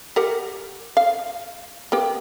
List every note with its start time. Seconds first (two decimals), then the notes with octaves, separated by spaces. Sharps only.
0.16 G4 A#4 F#5
0.97 F5
1.92 A#3 B3 G4